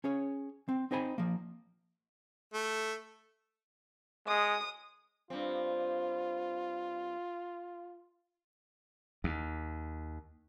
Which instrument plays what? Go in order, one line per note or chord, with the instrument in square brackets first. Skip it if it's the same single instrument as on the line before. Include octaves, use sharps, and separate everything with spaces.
[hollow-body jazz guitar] C#4 G#4 C#5
C4
C4 D#4 C5 G#5 B5
F3 A#3
[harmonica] A3
[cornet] G#3 [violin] D#6
[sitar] G2 C4 [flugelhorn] F4
[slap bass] D#2